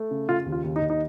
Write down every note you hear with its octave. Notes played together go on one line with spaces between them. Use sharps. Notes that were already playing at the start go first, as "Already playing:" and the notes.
Already playing: A3
C#3
C#3 F4
D#2
F4
D#2
D#4
D#2
D#4